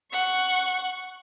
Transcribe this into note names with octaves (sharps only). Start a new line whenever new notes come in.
F#5 C#6